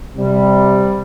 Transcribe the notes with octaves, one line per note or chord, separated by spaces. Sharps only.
C3 G3